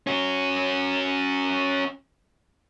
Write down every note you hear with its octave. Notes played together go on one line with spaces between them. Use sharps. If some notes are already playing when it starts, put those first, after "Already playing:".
C#4 F#4